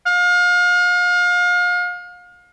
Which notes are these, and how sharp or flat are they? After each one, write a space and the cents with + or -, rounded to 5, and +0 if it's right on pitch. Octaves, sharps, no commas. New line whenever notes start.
F5 +35